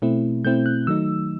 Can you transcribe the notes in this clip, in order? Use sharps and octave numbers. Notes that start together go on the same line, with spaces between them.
B2 A3 C4 E4
B2 A3 C4 E4 G6
F#6
D#3 F#3 A3 D#4 E6